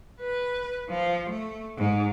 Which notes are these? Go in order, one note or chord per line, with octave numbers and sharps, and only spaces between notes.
B4
F3
A3
G#2